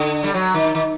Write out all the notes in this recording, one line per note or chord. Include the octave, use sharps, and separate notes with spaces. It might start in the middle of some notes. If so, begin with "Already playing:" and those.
Already playing: D3
G3
F#3
D#3
D#3